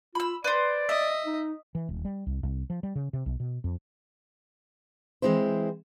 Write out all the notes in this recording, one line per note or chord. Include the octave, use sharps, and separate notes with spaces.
F4 B5 E6
B4 C5 D5
D#5 E5
D#4
E3
D#1
G3
C2
C2
F3
G3
C#3
C3
B1
B2
F2
E3 G#3 C4 E4 C5